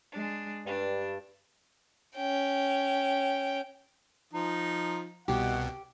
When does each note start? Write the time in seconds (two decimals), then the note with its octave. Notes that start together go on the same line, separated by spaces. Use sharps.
0.12 G#3 D4
0.66 G2 D4
2.16 C#4 G5
4.33 F3 D#4
5.28 C2 B2 G4 F#5